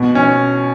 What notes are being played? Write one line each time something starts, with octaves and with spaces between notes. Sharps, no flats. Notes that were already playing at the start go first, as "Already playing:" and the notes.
Already playing: B2
C#4